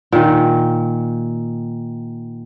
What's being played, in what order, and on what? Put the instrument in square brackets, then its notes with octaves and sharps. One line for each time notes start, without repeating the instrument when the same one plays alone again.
[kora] A#2 D#3